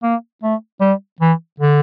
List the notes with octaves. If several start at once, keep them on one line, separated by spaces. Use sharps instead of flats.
A#3
A3
G3
E3
D3